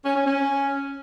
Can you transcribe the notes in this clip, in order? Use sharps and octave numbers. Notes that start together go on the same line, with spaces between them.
C#4
C#4
C#4